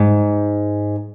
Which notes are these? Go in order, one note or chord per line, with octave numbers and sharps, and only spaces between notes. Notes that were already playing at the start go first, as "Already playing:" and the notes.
Already playing: G#2